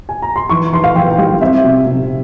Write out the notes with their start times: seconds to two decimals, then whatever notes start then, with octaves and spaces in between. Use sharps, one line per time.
0.09 G#5
0.22 A#5
0.36 C6
0.50 E3 C#6
0.73 E3 C6
0.84 F5
0.95 E3 G5
1.11 G5
1.18 G3 F5
1.41 C4 E5
1.64 C3
1.87 C3